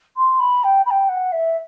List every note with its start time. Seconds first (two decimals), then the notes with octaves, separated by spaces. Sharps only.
0.17 C6
0.39 B5
0.63 G5
0.86 B5
0.90 G5
1.09 F#5
1.32 E5